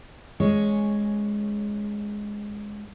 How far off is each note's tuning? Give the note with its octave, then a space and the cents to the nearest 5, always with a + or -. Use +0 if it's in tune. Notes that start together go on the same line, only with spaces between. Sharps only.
G#3 +0 C#4 +5 C#5 +0